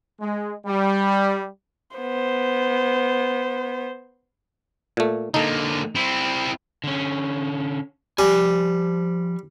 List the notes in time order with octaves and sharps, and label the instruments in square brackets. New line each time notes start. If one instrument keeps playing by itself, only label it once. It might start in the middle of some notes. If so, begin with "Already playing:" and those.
[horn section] G#3
G3
[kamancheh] B3 C5
[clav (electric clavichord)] A#2 A3
[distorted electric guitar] D3 A#3 [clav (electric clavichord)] D#4 A4
[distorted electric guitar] C4 E4
[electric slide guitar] D3 C#4
[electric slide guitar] F3 G#5 [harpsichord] G3